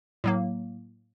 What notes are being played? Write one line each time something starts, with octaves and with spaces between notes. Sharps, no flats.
A2 F#3 A#3